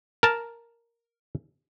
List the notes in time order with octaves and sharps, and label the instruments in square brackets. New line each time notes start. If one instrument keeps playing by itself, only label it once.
[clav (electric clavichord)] A#4 A5